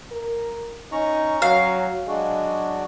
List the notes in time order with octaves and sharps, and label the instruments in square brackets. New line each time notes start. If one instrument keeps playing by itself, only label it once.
[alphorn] A#4
[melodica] C#4 A#5 C#6 [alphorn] D#4
[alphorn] F#3 [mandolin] F5
[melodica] F#3 D4 F#4 [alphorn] G#3